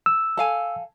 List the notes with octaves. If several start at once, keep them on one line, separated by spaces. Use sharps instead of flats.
E6
A4 F5 G#5